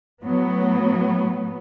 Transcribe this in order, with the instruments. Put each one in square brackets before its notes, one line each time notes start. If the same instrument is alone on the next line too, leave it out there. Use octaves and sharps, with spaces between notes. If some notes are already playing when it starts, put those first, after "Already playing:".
[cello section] A2 F#3 B3